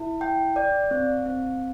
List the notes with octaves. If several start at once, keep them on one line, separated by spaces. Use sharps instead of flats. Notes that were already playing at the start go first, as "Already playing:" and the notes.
Already playing: E4
G5
D5
C4
C4